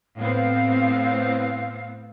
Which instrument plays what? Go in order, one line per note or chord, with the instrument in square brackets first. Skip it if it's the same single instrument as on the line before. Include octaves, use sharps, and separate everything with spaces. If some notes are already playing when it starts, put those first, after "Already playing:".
[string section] A2 B3 C4 [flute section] F5